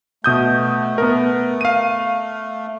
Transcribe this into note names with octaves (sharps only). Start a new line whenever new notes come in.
B2 A3 D#6 G6
B3 A#4
F5 D#7